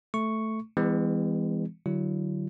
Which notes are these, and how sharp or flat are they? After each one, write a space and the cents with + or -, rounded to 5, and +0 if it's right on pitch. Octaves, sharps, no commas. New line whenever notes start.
A3 +0 C#6 +0
E3 +0 G#3 -35 B3 +45
D3 +35 F#3 +30 E4 +40